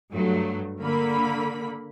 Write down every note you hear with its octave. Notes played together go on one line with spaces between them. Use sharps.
G2 F#3 A3
D3 A#3 B5